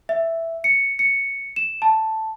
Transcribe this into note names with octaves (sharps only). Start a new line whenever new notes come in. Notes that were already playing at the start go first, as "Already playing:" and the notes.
E5
C#7
C#7
E7
A5